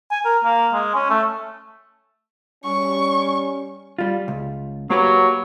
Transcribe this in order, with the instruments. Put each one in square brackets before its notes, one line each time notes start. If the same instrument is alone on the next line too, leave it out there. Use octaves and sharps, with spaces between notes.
[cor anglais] G#5
A#4
A#3
G#3
C#4
A3
[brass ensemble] G3 C#4 [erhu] C#6
[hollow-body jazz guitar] G3 F4
C#2
[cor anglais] F#3 [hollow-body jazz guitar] A#3 G4 B4